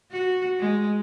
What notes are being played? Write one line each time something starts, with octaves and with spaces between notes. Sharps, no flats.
F#4
G#3